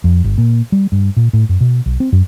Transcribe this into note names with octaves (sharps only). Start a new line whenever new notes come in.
F2
G1
A#2
G3
G2
A#2
A2
F#2
B2
B1
C4
F#2